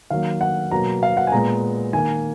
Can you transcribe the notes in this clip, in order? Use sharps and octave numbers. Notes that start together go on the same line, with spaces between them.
D#3 F#3 A#3 F5
F#5
B2 F#3 A#3 A#5
F5
F#5
G#5
A#2 G#3 B3 A#5
D#3 A#3 G#5